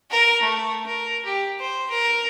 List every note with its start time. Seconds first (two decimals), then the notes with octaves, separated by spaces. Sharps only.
0.11 A#4
0.42 A3
0.86 A#4
1.25 G4
1.61 C5
1.90 A#4